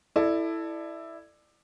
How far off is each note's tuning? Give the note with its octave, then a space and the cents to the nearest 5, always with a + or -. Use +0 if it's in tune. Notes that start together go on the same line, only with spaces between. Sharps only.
E4 +0 A4 +0 D5 +25